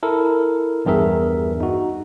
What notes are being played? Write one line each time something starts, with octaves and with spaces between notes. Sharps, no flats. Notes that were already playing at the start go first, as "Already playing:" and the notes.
E4 A4 A#4
A#1 E2 G2 G#4 A#4 E5
D#4 F#4